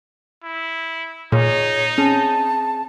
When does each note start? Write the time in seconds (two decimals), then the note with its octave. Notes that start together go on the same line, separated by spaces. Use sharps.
0.44 E4
1.32 A#2 D#4 G#4 C#5
1.98 C4 C#4 G#4 A5